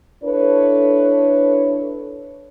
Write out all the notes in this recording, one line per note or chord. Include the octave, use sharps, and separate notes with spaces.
D4 E4 A4 B4 C#5